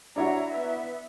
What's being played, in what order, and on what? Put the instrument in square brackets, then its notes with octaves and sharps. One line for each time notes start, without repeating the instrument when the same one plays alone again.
[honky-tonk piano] D4 E4 F#4 [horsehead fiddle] C#5 A#5
[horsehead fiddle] B3 E5